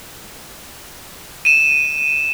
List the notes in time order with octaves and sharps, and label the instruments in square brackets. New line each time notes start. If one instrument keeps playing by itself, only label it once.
[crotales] D#7 E7